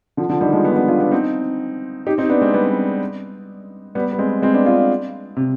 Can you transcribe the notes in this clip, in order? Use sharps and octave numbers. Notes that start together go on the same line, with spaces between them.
D3 F3
D3 F3
D#3 G3
F3 G#3
B3 D4
B3 D4
D4 F4
B3 D4
C4 D#4
D#4 G4
C4 D#4
B3 D4
G#3 C4
G3 B3
G3 B3
B3
G#3 C4
G#3 C4
B3 D4
D4 F4
C3